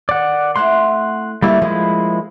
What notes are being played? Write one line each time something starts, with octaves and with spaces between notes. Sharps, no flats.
D#3 D5 F#5
A3 C4 E4 F#5 C6
G3 A3 A#3 D#4 E4 A#4
F3 G#3 A#3 E4